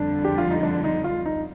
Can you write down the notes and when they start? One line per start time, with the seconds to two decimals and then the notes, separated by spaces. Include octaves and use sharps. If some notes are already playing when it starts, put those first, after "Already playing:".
Already playing: F2 D3 G3 D4
0.25 G4
0.38 F4
0.51 D#4
0.63 D4
0.84 D#4
1.04 F4
1.26 D#4